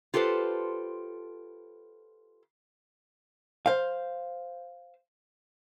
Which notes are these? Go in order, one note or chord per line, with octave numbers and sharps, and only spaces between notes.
F4 G4 A4 B4 C5
C5 F5